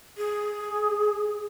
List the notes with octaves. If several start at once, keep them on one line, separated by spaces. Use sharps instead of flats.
G#4